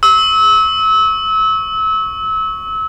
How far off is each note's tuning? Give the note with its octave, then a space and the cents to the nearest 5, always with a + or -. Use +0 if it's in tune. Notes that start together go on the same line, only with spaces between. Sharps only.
C#6 +0 E6 -30